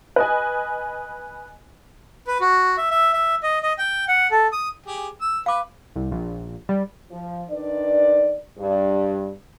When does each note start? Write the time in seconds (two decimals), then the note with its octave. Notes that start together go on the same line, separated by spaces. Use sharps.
0.16 B4 D#5 G#5
2.27 B4
2.41 F#4
2.78 E5
2.91 E5
3.13 E5
3.43 D#5
3.63 D#5
3.79 G5
4.08 F#5
4.31 A4
4.52 D#6
4.86 G4 G#4
5.21 E6
5.46 B4 F5 D6
5.96 C2
6.11 A#1
6.69 G3
7.11 F3
7.49 D#3 D4 B4 D5
8.56 G2